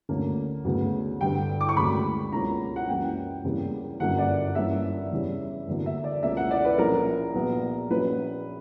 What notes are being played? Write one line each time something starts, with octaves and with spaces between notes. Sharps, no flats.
D2 D3 A#3 C#4
D2 C#3 F#3 B3
G2 D3 G3 G5
D6
C#6
E1 D2 C#3 F#3 A#3 B5
C#2 B2 F#3 A#3 C#4 A#5
F#5
F#2 E3 A#3 C#4 G5
E2 C#3 G3 A#3
G1 F#2 D3 A#3 C#4 F#5
D5
G1 G2 E3 A#3 C#4 E5
E2 C#3 G3 C#4
E2 D3 F#3 A#3
E5
D5
C#2 B2 A#3 C#4 E5
F#5
D5
B4
A#1 A#2 A#3 C#4 A#4
A#1 A#2 F#3 B3
A#1 A#2 F#3 C#4 B4